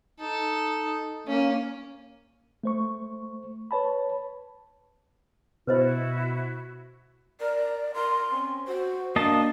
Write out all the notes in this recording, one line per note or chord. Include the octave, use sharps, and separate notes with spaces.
D#4 A4
A#3 C#4
A3 C5 C#6
B4 C#5 A5 B5
B2 E4 F#4 B4 C5 D#5
A#4 D5
A#4 C6
C4 C#4
F#4 C5
A#3 D4 D#5 A5